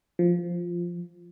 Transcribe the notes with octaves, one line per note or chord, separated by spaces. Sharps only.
F3